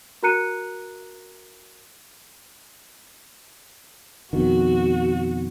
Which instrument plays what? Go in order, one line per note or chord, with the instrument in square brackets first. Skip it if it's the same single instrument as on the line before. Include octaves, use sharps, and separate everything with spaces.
[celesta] F#4 A#4 A#5 F#6 C#7 D#7
[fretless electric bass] F2 B2 D#3 [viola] F#4